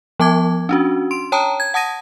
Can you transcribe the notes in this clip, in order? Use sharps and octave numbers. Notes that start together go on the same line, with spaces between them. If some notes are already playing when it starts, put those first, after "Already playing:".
F3 B3 A5 D6 G#6
C#4 D4 F#4
C6 D7
C#5 G5 A5 A#5 D#6
G#6
F#5 A5 D#6 G#6 A#6 D#7